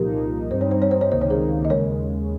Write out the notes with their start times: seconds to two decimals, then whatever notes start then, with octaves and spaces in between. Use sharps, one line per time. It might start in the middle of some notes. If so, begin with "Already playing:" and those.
Already playing: C2 A#2 F3 A#3 D#4 G4 A#4
0.51 G2 G3 C4 D#4 C5
0.61 C#5
0.71 C5
0.82 C#5
0.91 C5
1.01 C#5
1.11 C#2 C3 D#3 A#3 D#4 C5
1.21 C#5
1.30 G#4 C5
1.65 D#5
1.69 D#2 C#3 G#3 A#4 C#5